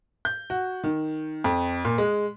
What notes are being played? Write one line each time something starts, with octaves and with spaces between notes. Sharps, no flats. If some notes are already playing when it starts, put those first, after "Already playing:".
G6
F#4
D#3
F2
A#2
G#3